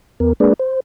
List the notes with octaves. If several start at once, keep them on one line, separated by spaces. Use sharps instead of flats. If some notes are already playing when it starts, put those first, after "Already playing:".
E2 B3 A#4
G#3 A#3 D4 G#4 B4 D5
C5